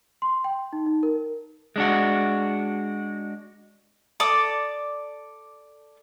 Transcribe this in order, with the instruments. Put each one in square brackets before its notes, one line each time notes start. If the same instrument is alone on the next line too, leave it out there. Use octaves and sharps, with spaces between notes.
[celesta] C6
G5
D#4
D#4
A#4
[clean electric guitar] G#3 D4 F#4
[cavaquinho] A4 D5 D6 D#6